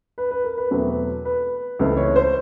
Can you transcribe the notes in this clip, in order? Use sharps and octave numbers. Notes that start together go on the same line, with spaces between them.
B4
B4
A#4
B4
E2 B2 F#3 A3 C4
B4
C#2 C#3 E3 A3 C4
C#5
C5